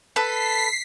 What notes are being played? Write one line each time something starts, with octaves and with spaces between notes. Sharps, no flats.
A4 B4 B6 C7